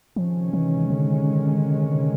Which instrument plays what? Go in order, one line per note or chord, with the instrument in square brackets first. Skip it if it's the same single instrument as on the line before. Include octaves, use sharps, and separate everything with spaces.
[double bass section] C3 D#3 G#3 C#4 [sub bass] F3
[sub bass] E3
D3